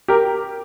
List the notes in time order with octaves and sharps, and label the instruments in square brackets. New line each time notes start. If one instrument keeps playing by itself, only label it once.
[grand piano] G4 A#4